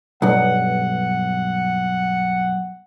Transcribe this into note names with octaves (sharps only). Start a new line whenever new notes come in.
B1 G2 F#5